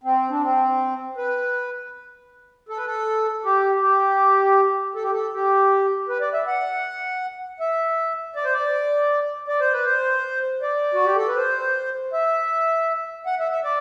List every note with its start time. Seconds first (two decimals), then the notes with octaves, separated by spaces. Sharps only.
0.04 C4
0.30 D4
0.41 C4
1.17 B4
2.69 A4
2.77 B4
2.86 A4
3.45 G4
3.81 G4
4.95 A4
5.03 G4
5.12 A4
5.33 G4
6.09 B4
6.20 D5
6.33 E5
6.47 F#5
7.60 E5
8.36 D5
8.44 C5
8.53 D5
9.48 D5
9.60 C5
9.73 B4
9.85 C5
10.62 D5
10.94 F#4
11.05 G4
11.16 A4
11.27 B4
11.37 C5
12.13 E5
13.26 F#5
13.39 E5
13.51 E5
13.64 D5